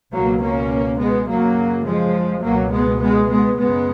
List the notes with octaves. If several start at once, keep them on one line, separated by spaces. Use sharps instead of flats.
C#2 B2 F#3 A#3
A#3 C#4
G#3 B3
F#2 C#3 F#3 A#3
F3 G#3
C#2 B2 F#3 A#3
G#3 B3
G#3 B3
G#3 B3
F#2 C#3 G#3 B3